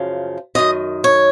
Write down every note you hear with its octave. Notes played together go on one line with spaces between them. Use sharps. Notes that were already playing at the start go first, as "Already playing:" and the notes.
Already playing: F#2 C#3 F3
F#2 D#3 D#5
C#5